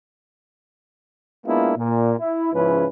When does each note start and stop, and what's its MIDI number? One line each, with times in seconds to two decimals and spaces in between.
1.46 1.72 56
1.46 1.72 58
1.46 1.72 59
1.46 1.72 62
1.46 1.72 64
1.46 1.72 65
1.77 2.12 46
2.18 2.50 64
2.53 2.86 44
2.53 2.86 49
2.53 2.86 53
2.53 2.86 61
2.53 2.86 64
2.53 2.86 71